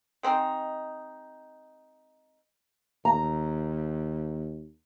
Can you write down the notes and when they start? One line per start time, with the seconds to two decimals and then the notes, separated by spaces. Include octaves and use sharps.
0.23 G#3 C4 D#4
3.05 D#2 A#5